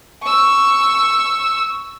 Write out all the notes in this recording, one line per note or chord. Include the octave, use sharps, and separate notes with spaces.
C#6 E6